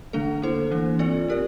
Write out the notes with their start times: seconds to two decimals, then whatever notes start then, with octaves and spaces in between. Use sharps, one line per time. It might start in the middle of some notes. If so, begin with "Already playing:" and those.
0.13 D3 A3 D4 A4
0.42 A#3 E4 A4 C5
0.71 E3 A#3 D4
0.99 C4 F4 A4 D5
1.28 C4 G4 A#4 D5